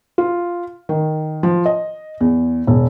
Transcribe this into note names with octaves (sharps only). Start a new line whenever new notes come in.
F4
D#3
F3
D#5
E2
E1